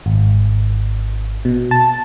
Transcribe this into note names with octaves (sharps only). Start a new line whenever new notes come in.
G#1
B2
A5